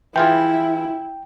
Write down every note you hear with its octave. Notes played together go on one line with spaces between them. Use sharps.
E3 E4 F4 G#4 G5